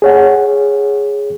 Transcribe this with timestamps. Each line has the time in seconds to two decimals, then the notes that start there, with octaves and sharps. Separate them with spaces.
0.02 G#4 C#5 F#5